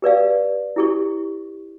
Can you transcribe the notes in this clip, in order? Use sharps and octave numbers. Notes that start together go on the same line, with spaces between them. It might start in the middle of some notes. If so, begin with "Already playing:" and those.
G4 B4 D5 F5
E4 G4 C#6